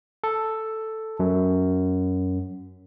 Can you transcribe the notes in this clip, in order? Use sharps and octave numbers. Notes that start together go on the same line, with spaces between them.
A4
F#2